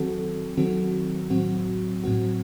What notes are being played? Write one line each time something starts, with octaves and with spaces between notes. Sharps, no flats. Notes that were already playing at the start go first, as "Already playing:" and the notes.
Already playing: D#3 F#3 C4 F#4 A4
D#3 F#3 C4 F#4 A4
A2 F#3 C4 F#4
A2 F#3 C4 F#4